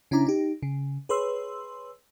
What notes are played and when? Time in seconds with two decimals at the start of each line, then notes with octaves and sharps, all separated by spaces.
0.11 C#3 C#4 D4 E4 A#5 D6
0.27 D#4 G4
0.63 C#3
1.09 G#4 B4 C#5 C6 E6